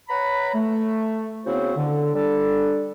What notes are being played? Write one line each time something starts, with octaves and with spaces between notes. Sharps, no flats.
B4 C#5 F#5 A#5 B5
A3
C#3 B3 C4 E4 F#4 C5
D3
G3 D4 A4